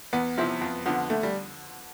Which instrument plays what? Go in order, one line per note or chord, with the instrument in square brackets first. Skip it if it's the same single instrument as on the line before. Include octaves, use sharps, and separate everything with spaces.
[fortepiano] E2 [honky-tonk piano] B3
[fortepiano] C3 F3 C4 E4
F2
D3 F3 B3
[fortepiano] D3 [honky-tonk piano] A3
[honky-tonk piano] G3